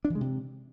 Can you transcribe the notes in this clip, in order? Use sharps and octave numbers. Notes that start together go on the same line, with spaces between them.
D4
E3
G#3
C3